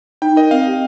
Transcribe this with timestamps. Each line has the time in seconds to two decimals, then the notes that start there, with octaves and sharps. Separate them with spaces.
0.22 D#4 G5
0.37 A#4 D#5
0.51 C4 F5
0.67 G4